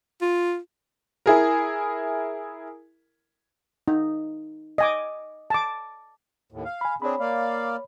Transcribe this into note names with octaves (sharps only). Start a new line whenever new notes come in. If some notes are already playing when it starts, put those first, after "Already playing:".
F4
E4 G#4 A#4
D#4
D#5 G#5 D6
A5 D6
D#2 A2
F5
G#5 B5
C4 D4 G#4 C#5 B5
A#3 D5 F5